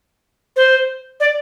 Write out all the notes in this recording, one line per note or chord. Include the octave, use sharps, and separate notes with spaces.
C5
D5